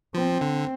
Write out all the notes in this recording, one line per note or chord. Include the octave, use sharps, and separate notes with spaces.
F3 C4
D3